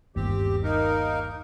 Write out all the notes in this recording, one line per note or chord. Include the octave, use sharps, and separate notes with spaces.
G1 D#2 C4 G4
A#3 D#4 A#4